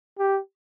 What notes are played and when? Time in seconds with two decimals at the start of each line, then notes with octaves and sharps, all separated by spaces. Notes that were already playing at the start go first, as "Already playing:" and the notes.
0.19 G4